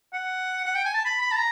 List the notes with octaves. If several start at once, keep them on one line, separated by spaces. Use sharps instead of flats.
F#5
F#5
G5
G#5
A5
B5
B5
A5
A#5